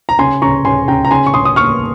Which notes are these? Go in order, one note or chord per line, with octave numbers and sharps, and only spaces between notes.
A#5
C#3 G#5 C6
C#3 A#5 C#6
C#3 G#5 C6
C#3 G5 A#5
A#5
C#3 G#5 C6
C#6
C#3 C6 D#6
D#6
A#3 C#6 F6